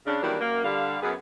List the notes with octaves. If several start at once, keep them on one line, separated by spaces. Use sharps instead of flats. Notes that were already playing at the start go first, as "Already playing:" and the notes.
C#3 D4
D#3 E3 F#3 G3 A#3 D4
F#2 A#3
D3 G3 F5
F#2 B3 G#4